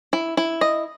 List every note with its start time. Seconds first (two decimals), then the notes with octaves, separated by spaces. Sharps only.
0.13 E4
0.37 E4
0.61 D#5